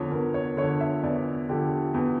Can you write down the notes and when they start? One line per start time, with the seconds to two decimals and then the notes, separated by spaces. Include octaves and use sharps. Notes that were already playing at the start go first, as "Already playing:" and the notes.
Already playing: E2 D3 F3 C#5
0.12 E2 A#4
0.34 C#5
0.57 D3 C#5
0.62 F3
0.81 E5
1.03 E2 D5
1.49 D3 F3 G4
1.94 E2